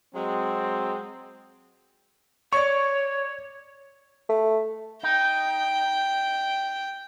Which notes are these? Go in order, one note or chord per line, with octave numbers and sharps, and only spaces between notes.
F#3 G#3 C4
C#5 D5 C#6
A3
D#4 G5